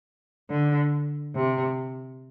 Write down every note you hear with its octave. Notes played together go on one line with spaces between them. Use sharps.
D3
C3